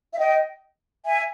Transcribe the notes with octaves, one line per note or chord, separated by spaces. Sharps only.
E5
D#5 G5
E5 G#5